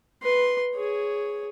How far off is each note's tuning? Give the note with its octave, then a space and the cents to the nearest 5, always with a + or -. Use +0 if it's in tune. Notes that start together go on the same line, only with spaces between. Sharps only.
B4 +0 C6 +0
G#4 +0 C#5 +5